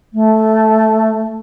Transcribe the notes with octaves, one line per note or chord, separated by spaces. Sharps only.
A3